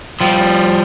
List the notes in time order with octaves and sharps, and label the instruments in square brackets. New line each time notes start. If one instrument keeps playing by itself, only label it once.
[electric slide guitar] F3 G3